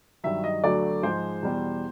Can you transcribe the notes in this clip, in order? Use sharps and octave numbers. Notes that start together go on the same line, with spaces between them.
G2 D#3 F#3 E5
D#5
D2 D3 F#3 A3 D5
G#2 F3 G#3 C5
E2 B2 G3